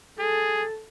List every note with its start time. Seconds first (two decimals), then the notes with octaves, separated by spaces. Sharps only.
0.19 G#4 A4